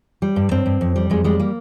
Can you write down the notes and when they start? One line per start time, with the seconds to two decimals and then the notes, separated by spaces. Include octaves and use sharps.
0.22 G3
0.36 G2
0.51 G2 C4
0.66 G2
0.81 F2
0.96 G3
1.10 F2 G#3
1.24 G3 G#3
1.40 A#3